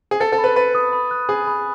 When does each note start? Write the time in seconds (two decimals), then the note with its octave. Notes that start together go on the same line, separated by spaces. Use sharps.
0.11 G#4
0.20 A4 A6
0.32 A4
0.38 B5
0.44 B4
0.56 B4 A6
0.75 D#6
0.93 B5
1.11 F#6
1.29 G#4 D#6
1.47 B5